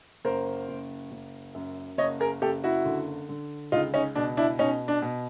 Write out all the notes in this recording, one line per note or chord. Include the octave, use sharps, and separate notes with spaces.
F#1 A#4 C5
F#1
F#1
F#2
F#1 C#5 D#5
G#4 A#4
F#1 G4 A4
E4 F#4
D3
D3
C#2 D#4 F4
C#4 D#4
B2 D4
D4 E4
B2 C#4 D#4
D4
B2